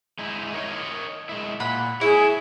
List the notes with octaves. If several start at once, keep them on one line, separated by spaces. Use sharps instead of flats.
G#3 D#4 E4
A#4 C#5 D#5
G#3 E4
A#2 F#5 B5
E4 G#4 C#5 E5